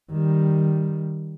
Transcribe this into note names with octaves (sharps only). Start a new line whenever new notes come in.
D#3 G3